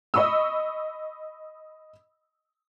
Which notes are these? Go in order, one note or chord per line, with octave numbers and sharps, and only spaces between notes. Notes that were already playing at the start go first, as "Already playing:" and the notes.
D#5 B5 C#6 D#6 E6